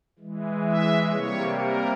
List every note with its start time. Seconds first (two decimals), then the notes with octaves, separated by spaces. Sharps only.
0.19 E3 G#3
0.66 E5
1.12 C3 G3 A#3 C#5
1.58 A#4